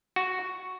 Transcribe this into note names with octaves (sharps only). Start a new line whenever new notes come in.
F#4